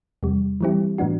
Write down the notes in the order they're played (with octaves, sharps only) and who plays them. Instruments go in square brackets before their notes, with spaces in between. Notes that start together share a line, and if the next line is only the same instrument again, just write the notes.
[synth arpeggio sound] E2 C3 G3
E3 G3 C4 E4 G4
A2 E3 B3 D4 F#4